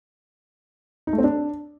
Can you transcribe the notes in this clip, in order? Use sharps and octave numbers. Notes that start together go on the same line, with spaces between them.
D#4
A3
C4
D4